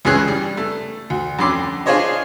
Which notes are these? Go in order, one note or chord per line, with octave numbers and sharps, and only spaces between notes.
C#2 G2 E3 C#4 G#4 F#6
G3
A3
D2
F2 D3 C#4 B5 C6 D6
D4 F4 G#4 C5 C#5 D#5